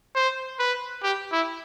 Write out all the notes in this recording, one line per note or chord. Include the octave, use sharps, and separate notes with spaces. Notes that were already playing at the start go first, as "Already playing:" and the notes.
C5
B4
G4
E4